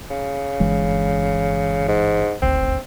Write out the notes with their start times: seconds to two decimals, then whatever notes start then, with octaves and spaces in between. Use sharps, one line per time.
0.10 C#3
0.60 G1 E3 G#3
1.88 G#2
2.42 D#1 G#1 D2 C4